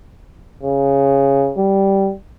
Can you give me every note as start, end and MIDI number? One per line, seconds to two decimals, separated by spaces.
0.63 1.52 49
1.57 2.12 55